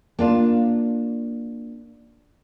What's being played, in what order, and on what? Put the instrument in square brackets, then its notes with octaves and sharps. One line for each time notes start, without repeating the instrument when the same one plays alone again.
[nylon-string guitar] A#3 D4 F4